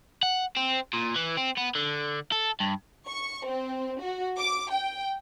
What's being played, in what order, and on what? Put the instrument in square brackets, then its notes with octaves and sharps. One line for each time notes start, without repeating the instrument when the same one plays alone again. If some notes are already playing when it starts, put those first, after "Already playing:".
[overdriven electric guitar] F#5
C4
A#2
E3
C4
B3
D3
A4
G2
[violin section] C#6
C4
F#4
D6
G5